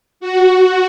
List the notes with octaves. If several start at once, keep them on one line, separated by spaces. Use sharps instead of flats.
F#4